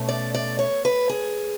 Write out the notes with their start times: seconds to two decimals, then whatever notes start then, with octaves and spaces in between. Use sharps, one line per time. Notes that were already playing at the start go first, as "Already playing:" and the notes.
Already playing: B2 A3 C#4
0.09 D5
0.34 D5
0.59 C#5
0.85 B4
1.09 G#4